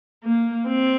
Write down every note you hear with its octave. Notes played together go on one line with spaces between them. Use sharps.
A#3
C4